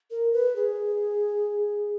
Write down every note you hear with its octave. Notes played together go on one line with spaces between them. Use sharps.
A#4
B4
G#4